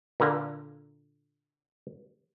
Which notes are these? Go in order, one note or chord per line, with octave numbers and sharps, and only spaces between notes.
A#2 D3 A#3